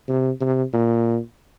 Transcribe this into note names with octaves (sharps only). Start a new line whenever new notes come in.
C3
C3
A#2